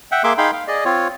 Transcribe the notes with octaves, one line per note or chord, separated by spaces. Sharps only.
E5 F#5 G5
A#3 G#4 E5 C6 D6
D#4 G#4 F5 G5 B5 C6
F5
G#4 D5 D#5
C4 F4 C#5